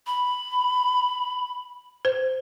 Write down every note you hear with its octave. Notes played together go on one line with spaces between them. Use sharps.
B5
C5